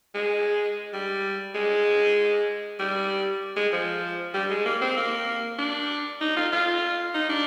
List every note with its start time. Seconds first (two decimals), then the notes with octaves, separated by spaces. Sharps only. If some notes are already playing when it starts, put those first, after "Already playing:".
0.15 G#3
0.93 G3
1.55 G#3
2.79 G3
3.56 G#3
3.73 F3
4.34 G3
4.51 G#3
4.66 A#3
4.81 C4
4.97 A#3
5.59 D4
6.21 D#4
6.37 F4
6.52 F4
7.15 D#4
7.29 D4